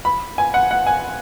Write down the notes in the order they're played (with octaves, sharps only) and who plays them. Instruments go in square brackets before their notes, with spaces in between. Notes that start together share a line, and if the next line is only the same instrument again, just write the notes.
[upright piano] B5
G#5
F#5
F#5
G#5